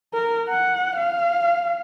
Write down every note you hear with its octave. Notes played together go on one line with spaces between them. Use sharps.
A#4
F#5
F5